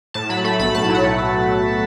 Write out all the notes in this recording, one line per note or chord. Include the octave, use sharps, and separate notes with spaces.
A2 A5
F#3 B5
A3 B5
B1 B5
A2 A5
F#3
F#5
A3